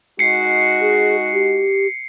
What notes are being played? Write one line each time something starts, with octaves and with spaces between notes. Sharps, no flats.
G#3 D#4 F#4 C7 C#7
G#4
G4